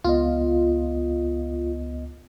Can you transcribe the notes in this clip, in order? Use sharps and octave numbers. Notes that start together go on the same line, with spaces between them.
C#2 B3 F4 D#5